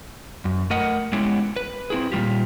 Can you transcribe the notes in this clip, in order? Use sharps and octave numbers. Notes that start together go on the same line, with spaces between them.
F#2
A3 A#4 D#5 F#5
G#3 B3 C#4 E4 G4
B4
C4 E4 G#4
A#2 E3 G3 F4 G4